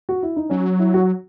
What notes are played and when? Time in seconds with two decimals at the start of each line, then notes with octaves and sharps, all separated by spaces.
0.09 F#4
0.23 E4
0.36 D#4
0.50 F#3 C#4
0.79 E4
0.94 F#4